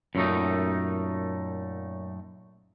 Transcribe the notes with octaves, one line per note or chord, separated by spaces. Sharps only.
F#2 A#2 A3 D#4